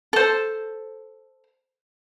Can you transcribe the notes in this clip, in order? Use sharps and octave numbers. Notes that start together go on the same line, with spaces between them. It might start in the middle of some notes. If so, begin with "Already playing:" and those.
A4 C5